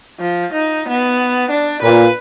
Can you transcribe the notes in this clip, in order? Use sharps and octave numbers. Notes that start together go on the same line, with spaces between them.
F3
D#4
B3
D4
A#2 B4